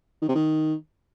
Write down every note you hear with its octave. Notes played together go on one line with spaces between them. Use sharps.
D#3
C3
D#3